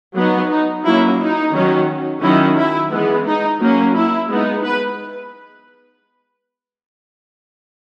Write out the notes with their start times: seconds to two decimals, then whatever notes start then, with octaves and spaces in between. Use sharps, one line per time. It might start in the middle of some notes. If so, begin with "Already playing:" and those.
0.16 F#3 B3 D#4
0.51 D#4
0.85 F#3 A#3 C#4 E4
1.20 D#4
1.54 D#3 F#3 C#4
2.22 D#3 F#3 C#4 E4
2.57 E4
2.92 E3 G#3 B3
3.26 D#4
3.61 F#3 A#3 C#4
3.95 E4
4.29 G#3 B3 D#4
4.64 B4